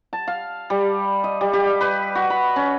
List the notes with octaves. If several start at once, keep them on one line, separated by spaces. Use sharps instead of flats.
A5
F5
G3
D#5
G3
G4
B4
F#4
B5
C#4